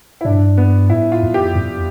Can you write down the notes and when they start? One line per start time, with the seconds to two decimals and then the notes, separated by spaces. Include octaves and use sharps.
0.21 E4
0.25 G2 D4
0.57 B3
0.90 A2 E4
1.12 F4
1.23 F2
1.34 G4
1.55 F2